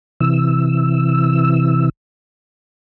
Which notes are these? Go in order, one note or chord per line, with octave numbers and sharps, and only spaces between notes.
C3 E3 E6